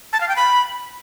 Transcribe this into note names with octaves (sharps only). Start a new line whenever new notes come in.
A5
F5
G5
B5